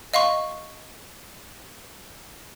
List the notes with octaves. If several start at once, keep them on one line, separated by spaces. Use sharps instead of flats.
D#5 F5 C6 C#6